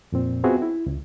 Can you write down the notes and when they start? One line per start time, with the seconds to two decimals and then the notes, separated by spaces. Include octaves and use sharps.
0.12 F2 A#2 C4
0.44 B3 C4 F4 F#4 G#4 E5
0.62 E4
0.86 C#2